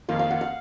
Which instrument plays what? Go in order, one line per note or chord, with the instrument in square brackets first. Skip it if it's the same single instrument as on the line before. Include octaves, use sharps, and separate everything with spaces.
[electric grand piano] F2 D#3 A#3 F4 [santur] F5
[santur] F5
F#5
F5